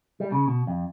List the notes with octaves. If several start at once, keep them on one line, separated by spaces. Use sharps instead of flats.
G3
C#3
B2
F2